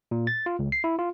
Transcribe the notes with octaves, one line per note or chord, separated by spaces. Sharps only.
A#2
A6
F4
C#2
C7
E4
F4